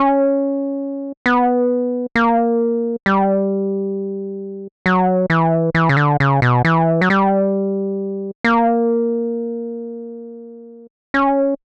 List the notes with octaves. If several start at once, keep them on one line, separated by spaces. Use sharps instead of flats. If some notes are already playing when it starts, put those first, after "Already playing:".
Already playing: C#4
B3
A#3
G3
F#3
E3
E3
C#3
D3
C#3
B2
E3
F#3
G3
A#3
C#4